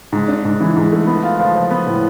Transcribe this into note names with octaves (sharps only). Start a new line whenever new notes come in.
G#2
D4
G#2
E3
G#2
A3
B3
F4
F3
F3
B3
A2